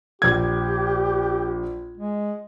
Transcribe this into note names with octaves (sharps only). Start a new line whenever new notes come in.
A#1 G4 G#6
G#3